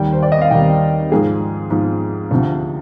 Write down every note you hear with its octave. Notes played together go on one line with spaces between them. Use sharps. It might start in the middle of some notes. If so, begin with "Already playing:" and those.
Already playing: D#2 D#3 G3 G5
C5
D5
D#5
F5
D#2 D#3 G3 G5
G#2 F3 G#3 G#4
G#2 F3 G#3
D2 C3 F3